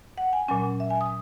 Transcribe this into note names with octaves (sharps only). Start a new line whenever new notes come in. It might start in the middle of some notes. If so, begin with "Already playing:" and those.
F#5
G#5
A#2 F#3 C#4 G#5
E5
G#5
D#6